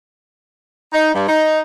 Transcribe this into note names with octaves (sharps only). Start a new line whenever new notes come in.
D#4
G2
D#4